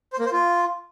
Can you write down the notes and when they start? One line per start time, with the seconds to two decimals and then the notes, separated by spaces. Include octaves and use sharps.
0.13 C5
0.19 A#3
0.26 C5
0.32 F4